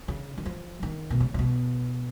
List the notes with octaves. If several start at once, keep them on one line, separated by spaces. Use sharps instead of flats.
C#3
D#3
F3
D#3
B2
C#3
C#3
B2